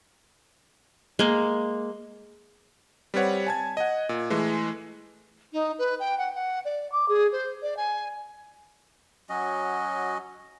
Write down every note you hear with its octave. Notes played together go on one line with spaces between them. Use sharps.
G#3 A#3
G3 C4 B4 C#5 F#5
G#5 A5 G#6
D#5 F#5
A#2
E3 G#3 A3
D#4
B4
G5
F#5
F#5
D5
D6
G#4
C5
D5
G#5
F#3 C#4 F#4 D#5